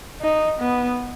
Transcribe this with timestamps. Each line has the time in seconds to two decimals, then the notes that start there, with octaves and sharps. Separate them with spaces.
0.21 D#4
0.61 B3